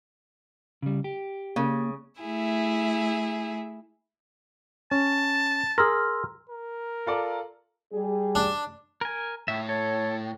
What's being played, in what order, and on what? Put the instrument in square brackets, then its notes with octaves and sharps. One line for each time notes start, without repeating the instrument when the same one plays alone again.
[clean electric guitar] C#3 G3
G4
[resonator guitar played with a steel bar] C#3 [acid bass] A#3
[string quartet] A3 E4 G#4 E5
[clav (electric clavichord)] C#4 [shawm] A5
[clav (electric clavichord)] G#4 A#4 [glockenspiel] C6 E6 F6
[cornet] A#4
[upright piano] F4 A4 D5
[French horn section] G3 G#4
[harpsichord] D4
[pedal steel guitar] A#4 G#5
[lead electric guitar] A2 [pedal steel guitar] E5
[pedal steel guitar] A4 [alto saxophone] C#5